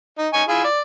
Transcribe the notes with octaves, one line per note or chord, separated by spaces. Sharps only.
D#4
D#4 G#5 C#6
E4 F4 G#4
D5